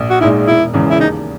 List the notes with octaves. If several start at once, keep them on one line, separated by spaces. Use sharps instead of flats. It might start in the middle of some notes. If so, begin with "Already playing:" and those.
Already playing: A#1
F#4
A#2 G#3 D#4 E4
E1 E4
E2 C#3 E3 G#3
E4
D#2 D#4